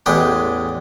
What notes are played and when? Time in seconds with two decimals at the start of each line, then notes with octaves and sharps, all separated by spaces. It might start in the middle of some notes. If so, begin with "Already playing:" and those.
0.06 A1 E2 G#3 G4 B4 G5